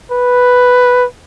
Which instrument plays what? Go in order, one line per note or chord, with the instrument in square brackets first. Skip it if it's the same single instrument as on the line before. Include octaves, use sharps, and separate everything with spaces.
[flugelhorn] B4